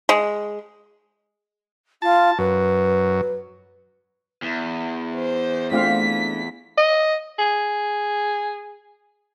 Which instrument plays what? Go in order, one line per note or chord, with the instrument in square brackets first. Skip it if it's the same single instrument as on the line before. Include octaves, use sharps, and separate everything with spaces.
[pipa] G#3
[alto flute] F4 [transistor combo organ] A5
[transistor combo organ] F#2 [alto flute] B4
[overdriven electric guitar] E2
[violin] C5
[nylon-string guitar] A3 D4 [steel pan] C4 F4 F5 [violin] B6
[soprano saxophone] D#5
G#4